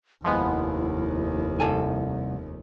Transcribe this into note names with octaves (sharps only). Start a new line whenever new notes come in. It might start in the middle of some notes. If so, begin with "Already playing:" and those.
F1 D#2 F3 G#3 B3 E4
C2 A4 G#5